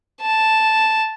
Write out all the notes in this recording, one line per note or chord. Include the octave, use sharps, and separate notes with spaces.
A5